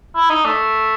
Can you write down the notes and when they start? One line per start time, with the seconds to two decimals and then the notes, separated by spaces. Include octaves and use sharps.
0.16 E4
0.30 D#4
0.45 A3